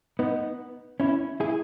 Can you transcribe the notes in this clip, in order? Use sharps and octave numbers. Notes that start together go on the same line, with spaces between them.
B3 D#4
C#4 E4
E4 G#4